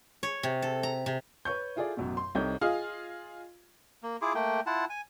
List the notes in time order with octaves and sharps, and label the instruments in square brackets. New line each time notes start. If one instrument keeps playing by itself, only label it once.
[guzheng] C#5
C3
A4
A#5
C3
[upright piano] B4 C#5 C#6 G6
E4 F4 G#4 A4 D5
A1 F#2 B2
C6
C2 C4 D#4 A4 C#5 G6
[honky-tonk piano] F4 G#4 D#5 F5
[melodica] A#3
E4 F4 G#4 D6
A3 A#3 G5
E4 F4 F#5 A5
G#5